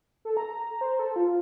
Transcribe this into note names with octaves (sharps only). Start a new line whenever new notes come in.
A4
A#5
C5
A4
F4